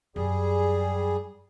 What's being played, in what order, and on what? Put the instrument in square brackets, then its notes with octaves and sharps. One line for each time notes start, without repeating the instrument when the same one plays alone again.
[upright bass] F#2 [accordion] G3 G#4